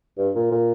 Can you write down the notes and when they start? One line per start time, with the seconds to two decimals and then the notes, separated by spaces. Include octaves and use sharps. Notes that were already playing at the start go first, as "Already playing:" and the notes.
0.18 G2
0.35 A#2
0.52 A#2